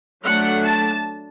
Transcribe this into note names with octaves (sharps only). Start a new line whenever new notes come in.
F#3 A3 D4 F#5
A5